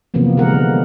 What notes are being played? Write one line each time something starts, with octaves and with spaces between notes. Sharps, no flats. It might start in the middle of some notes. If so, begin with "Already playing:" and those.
C3 E3 F3 A#3 B3
D3 G3 G#3 B3 A#4 F#5
B3